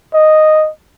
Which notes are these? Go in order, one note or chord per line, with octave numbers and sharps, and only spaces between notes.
D#5